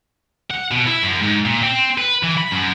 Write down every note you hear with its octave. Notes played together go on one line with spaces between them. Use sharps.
F#5
B2
E4
F#2
G#2
A#2
C4
B4
E3
B5
F#2